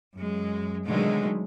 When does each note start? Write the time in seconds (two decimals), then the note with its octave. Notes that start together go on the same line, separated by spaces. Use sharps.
0.17 F#2 G#3
0.87 B2 D3 D#3 F#3 G#3 A3